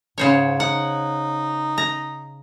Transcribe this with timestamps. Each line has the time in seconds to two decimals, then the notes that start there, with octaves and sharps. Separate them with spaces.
0.18 G#2 C#3 C5 C#5
0.60 D#4 F#5
1.78 A#5